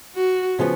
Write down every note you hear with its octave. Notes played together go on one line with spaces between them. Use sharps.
F#4
C#3 F3 B3